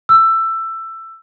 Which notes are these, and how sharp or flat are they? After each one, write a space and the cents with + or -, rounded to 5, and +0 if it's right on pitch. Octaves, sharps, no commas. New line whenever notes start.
E6 +15